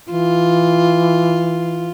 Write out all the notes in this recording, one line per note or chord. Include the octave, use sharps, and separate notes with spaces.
E3 F4